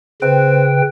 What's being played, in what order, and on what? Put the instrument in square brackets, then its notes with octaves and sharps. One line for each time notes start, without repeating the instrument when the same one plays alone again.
[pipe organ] C#3 B4 G5 [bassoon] C4